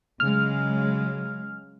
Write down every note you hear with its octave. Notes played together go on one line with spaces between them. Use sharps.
C#3 F#3 G#3 F6